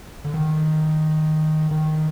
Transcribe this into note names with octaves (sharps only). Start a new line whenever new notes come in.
D3
D#3
D#3